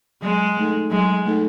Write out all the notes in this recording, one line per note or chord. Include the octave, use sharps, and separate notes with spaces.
F#3 G#3
A3 D#4 A4
F#3 G#3
A3 D#4 A4